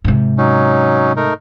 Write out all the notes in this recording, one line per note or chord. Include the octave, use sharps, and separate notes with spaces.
G#2 C3
F#3 C#4 D#4
A3 D#4 A#4